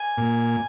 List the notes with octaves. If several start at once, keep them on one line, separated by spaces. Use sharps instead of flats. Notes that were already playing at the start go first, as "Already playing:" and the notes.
Already playing: G#5
A#2